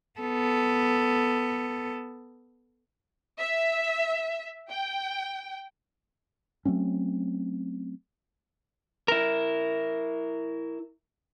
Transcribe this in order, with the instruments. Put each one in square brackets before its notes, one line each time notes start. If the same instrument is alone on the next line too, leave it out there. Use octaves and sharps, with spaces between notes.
[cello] B3 A4
[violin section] E5
G5
[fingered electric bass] F#3 A3 C4 C#4
[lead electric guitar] E4 A#4